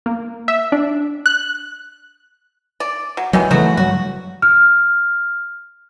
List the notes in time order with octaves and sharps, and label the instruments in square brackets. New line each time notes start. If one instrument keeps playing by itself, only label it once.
[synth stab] A#3
E5
D4
F#6
[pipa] D5
F#3
[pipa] D#3 E3 G#3 [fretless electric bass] F#3
[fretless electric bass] C#3 E3 A3 [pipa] F#3 B3 F#4
[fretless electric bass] G2 F#3 [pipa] F#4
[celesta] F6